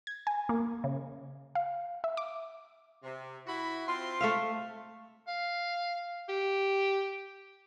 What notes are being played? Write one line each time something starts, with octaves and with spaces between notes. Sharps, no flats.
G#6
G#5
A#3
C#3
F5
E5
D6
C3
E4 F#4 B5
C4 F4 C6
A3 E5 F5
F5
G4